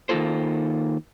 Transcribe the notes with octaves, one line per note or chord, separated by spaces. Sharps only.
D#3 A#3 D#4 F4 A4 C5